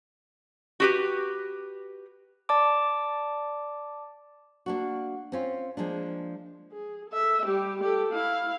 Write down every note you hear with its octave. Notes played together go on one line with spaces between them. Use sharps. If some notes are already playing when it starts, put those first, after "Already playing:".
F#4 G4 B4
D5 A5 D6
A#3 D4 F#4
C4 C#4 F4
F3 G#3 A#3 D4
G#4
A4 E5
G3 G4
G4 A4
E4 F5